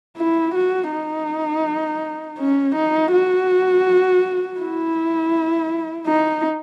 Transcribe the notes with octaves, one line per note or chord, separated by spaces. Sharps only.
E4
F#4
D#4
C#4
D#4
F#4
E4
D#4